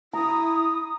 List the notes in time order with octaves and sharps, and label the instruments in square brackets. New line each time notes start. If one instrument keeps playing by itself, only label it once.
[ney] E4 [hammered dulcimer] A#5 [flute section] D#6